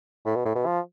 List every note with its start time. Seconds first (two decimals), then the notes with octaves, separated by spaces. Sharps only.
0.26 A2
0.35 B2
0.45 A2
0.55 B2
0.66 F3